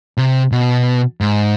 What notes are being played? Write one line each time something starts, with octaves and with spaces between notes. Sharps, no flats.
C3
B2
G#2